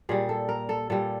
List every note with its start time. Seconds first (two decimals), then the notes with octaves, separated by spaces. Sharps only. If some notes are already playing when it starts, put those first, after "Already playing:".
0.09 A#2 G3 G#4
0.29 A4
0.49 A#4
0.69 A4
0.90 A#2 G3 A4